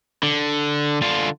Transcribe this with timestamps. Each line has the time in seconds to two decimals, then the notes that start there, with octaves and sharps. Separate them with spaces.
0.23 D3
1.02 D3 F4